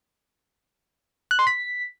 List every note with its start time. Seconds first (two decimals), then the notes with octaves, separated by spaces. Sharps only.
1.31 F#6
1.39 C6
1.47 B6